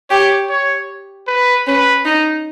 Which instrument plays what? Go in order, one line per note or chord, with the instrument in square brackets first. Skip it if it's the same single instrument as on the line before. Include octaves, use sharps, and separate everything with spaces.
[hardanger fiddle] G4 [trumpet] C#5
[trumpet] C#5
B4
[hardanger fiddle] C#4 [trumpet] B4
[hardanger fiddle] D#4